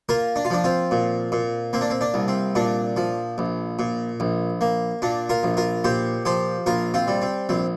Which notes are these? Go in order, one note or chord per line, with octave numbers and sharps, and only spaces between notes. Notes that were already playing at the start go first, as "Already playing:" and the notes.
A#3 F4 A#4
D4
F4
F3 D4
C4 F4
A#2
A#2
A#3 C4
D4
C4
D4
C2
C4
A#2 D4
F3
A#1
A#2
A#1
A#3
A#2 D4
F4 A#4
A#1
F4 A#4
A#2 G4 C5
F3 G4 C5
A#1 F4 A#4
C4 F4
G3
C4
A#1 C4